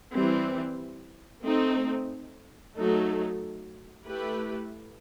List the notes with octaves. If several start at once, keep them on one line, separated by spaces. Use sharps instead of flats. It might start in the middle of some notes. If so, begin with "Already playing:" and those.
E3 G3 C4
A3 C4 D#4
F#3 A3 D#4 A4
A3 E4 G4 B4